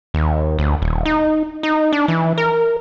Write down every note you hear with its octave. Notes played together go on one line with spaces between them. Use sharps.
D#2
D2
D#1
D#4
D#4
D4
E3
A#4